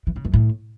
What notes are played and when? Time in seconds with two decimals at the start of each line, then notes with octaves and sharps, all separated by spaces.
0.07 E3
0.16 C#3
0.25 F#2
0.34 A2